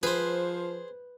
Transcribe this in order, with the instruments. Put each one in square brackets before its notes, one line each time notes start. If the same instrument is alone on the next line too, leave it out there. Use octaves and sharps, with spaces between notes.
[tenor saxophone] F3 [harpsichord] G#4 C5 [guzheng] B4